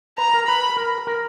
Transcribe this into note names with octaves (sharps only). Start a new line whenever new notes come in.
B4 A#5
A#4
B4 B5
A#4
A#4